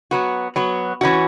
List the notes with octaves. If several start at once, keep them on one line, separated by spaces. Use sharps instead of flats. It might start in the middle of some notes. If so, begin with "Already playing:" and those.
F#3 B3 F#4
F#3 B3 F#4
E3 C#4 F#4